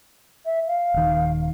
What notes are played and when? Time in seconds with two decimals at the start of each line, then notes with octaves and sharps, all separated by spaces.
0.45 E5
0.67 F5
0.94 D#1 D#3